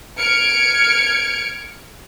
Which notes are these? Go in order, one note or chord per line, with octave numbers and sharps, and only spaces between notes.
F6 G#6 C#7 D7